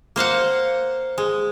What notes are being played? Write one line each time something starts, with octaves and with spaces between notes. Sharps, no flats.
A#3 C5 F5 F#5
G#3